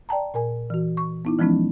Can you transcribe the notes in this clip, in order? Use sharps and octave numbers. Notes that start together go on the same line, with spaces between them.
D5 G5 A5 A#5
A#2 A#4 G#5
E3 F#4
C#6
B3 D#4 E4
E3 F3 G#3 B3 C#4 D#4